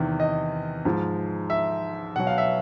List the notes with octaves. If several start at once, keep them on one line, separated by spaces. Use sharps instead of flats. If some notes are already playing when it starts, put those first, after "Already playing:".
Already playing: E2 C3 D#3
D#5
G#2 F3 G#3
E5
B2 F#3 F#5
F5
E5